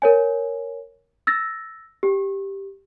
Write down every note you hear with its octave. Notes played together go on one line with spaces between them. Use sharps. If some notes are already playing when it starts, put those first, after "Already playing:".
A#4 C#5 G#5
E6 A6 A#6
G4